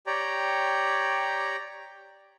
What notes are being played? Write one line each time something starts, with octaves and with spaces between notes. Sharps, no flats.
G4 C#5 D5 G5 A#5